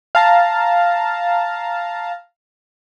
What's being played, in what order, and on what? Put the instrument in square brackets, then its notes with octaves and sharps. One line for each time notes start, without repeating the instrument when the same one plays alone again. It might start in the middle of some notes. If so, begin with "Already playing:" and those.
[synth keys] F5 A5 A#5